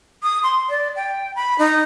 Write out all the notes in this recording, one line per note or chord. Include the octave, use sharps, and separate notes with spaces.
D#6
C6
D5
G5
B5
D#4